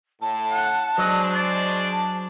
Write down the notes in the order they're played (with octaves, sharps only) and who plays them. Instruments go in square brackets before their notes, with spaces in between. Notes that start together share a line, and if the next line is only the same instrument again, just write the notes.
[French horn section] A2 [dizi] A5
[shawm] F#5
[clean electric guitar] F#3 [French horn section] G#3 D4 C5 [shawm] D#5
[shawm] D5
[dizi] A5